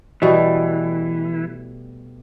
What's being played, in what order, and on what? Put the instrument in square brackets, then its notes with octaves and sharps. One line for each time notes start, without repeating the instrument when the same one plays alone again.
[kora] B2 G3 A3 [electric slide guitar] E3